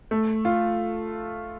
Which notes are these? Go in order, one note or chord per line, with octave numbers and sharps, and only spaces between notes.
A3
F4